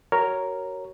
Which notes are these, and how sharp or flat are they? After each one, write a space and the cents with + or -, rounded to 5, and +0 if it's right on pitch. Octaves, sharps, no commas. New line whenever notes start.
F#4 +30 A#4 +0 C#5 +0